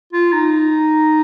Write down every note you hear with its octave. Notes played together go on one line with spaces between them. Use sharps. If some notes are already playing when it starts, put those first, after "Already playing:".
F4
D#4